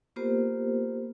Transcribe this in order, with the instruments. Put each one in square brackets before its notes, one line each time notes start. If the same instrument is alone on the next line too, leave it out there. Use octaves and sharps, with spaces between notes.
[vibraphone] A#3 B3 F4 G4 A#4 C5